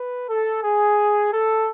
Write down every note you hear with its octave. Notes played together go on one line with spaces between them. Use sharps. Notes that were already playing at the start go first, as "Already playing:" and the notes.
Already playing: B4
A4
G#4
A4